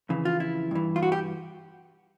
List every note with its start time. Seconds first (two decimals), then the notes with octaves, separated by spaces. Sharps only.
0.09 F2 C#3 E3
0.25 F4
0.40 E4
0.71 G2 E3
0.96 F4
1.03 F#4
1.12 G4